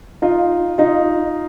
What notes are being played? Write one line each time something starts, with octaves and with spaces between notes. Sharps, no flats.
D#4 F4
D#4 F4